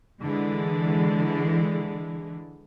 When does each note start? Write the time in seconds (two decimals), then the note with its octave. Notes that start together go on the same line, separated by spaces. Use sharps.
0.23 D3 E3 G#3